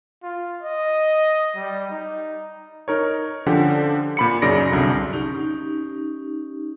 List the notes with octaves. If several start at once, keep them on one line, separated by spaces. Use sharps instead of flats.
F4
D#5
G3
D#4
D#4 A#4 C#5
D3 F3 C#4 G4 F#5
A#2 B5 C#7
F#2 C#3 D#4 D5 A#6 D7
C2 F#2 D3
C#4 D#4 G4